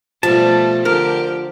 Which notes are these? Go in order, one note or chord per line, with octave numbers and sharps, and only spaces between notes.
B2 F3 G3 A3 A5
D3 G4 A#4